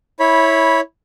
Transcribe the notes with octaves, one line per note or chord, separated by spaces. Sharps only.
E4 C#5 B5